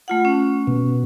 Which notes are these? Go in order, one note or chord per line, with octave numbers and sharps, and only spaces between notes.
A3 F4 F#5
C#4
B2